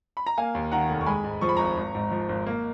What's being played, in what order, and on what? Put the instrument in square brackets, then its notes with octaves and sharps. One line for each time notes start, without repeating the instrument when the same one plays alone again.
[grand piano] B5
A#5
A#3 F5 G#5
D#2
D#3 F#5 A#5
F1
C#6
G#3 G#5 B5
G#2
F3 C#6
B5
G#1 A#5 C#6
G#1
G#2
F3
G#1
A#3